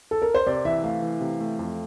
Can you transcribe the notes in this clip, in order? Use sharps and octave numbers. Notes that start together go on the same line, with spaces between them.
A4
A#4
C5
C3 D5
E3 E5
A3 F5
E3
C3
A3
F2